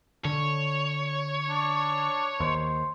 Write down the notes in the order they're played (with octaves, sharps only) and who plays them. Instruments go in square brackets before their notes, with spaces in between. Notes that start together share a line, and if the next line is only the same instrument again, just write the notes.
[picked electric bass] D3 [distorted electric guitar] C#5
[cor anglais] D4
[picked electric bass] D#2 [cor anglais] C5